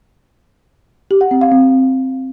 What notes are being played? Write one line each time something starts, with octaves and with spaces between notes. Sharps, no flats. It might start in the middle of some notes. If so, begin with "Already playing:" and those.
G4
F#5
C4
F5
C4